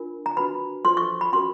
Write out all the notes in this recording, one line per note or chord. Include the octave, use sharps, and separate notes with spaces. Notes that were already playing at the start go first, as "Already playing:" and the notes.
Already playing: D4 F4 A#4
A#5
D4 F#4 B4 B5
F4 A4 C5 C6
C#6
B5
C#4 F#4 A#4 C6